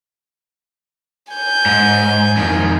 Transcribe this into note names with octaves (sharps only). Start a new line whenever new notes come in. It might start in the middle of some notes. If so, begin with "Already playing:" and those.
G#5 G6
G#2
F2 D#3